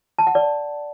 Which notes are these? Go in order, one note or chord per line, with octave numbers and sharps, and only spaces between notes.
A5
F#5
D5